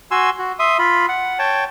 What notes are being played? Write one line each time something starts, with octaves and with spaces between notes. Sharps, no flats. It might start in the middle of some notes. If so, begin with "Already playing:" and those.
F#4 G#5 C6 E6
F#4
E5 C6 D#6
F4 B5
F#5
C#5 G5 A5